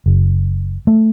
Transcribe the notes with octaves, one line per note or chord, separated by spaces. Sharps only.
F#1
A3